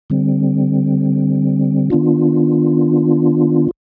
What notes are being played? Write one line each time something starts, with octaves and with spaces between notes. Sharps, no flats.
D3 G3 C4
D#3 B3 D4 F4